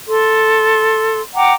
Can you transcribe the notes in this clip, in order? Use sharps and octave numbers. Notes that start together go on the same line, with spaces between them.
A4 C6
F#5 G5 A#5 D6